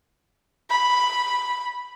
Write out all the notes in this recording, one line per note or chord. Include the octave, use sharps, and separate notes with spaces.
B5